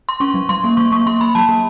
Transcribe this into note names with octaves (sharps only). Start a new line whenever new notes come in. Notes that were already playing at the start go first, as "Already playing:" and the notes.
C6
C#4 C#6
F#3
F#3 C6
A#3
F#3 C#6
A#3 C#6
A#3 C6
A#3 B5
F#3 A5
A#3